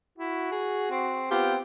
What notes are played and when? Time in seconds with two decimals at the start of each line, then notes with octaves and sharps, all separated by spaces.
0.18 E4 F#4
0.52 G#4
0.90 C4
1.31 B3 C4 F4 G4 G5